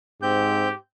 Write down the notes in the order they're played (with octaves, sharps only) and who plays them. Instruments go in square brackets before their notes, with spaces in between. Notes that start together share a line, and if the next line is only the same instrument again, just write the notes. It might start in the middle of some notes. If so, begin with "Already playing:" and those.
[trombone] G#2 [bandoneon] C4 G6 [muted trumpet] G4